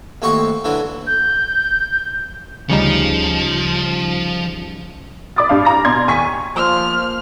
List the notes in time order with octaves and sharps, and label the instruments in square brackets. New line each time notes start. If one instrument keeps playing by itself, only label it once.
[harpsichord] D#2 A2 C4 F#4 C6 C#6
D3 E3 F#3 D4
[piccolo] G6
[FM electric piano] D2 C#7 [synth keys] C#3 G3 D#4 [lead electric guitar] F3
[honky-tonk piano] D5 B5 D6 D#6 A6
G2 D4 F5
A#5 A#6
B2 D5 C6 G#6
D#2 G#5 C#6 B6
[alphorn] F3 [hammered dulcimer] A#3 C5 [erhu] F6